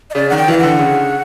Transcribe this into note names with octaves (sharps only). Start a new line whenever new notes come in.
D#5
C#3 D5
D#3 F#5
G5
E3 F5
D3 F#5
C#3